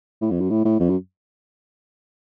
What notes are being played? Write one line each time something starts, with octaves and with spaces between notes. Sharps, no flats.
A2
F2
F#2
A2
A2
F2
F#2